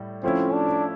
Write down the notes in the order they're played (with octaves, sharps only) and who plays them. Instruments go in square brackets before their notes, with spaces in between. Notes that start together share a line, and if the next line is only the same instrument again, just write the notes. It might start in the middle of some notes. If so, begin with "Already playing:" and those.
Already playing: [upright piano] A2 G3
[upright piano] F3 A3 C#4 E4 [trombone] C4
[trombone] D4